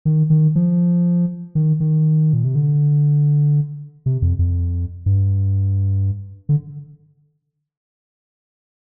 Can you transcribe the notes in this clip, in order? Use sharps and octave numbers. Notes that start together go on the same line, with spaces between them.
D#3
D#3
F3
D#3
D#3
A#2
C3
D3
C3
F2
F2
G2
D3